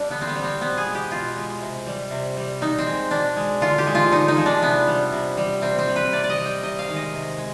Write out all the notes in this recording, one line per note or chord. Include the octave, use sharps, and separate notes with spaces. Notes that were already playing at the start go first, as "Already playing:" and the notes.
Already playing: G3 D4
D3 B3
C4
B3
G3
C4
B2 B3
G#4
G#3
G4
B2 F4
G#3
C3
G3
C3
G3
B2 D#4
C4
G#3
B2 D4
G#3
D3 F4
G4
F3 G#3
F4
D3 D#4
D#4
F3 G#3
D4
C3 B3
G3
C3
G3
C3 C4
C4
G3
B4
C3 D5
D5
D#5
G3
G5
C3 D#5
F5
D#3 G#3
D#5
C3
G#3